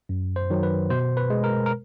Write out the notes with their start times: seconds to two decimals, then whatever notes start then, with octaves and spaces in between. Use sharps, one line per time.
0.09 F#2
0.36 C5
0.50 D#3 F#3
0.63 B4
0.90 B2 C5
1.17 B4
1.30 G#3
1.44 A#4
1.66 A#4